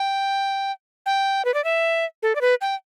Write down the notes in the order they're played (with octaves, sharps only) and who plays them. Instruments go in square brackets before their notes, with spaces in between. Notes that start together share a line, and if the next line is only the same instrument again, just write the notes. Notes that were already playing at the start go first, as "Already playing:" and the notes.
Already playing: [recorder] G5
G5
B4
D5
E5
A4
D5
B4
G5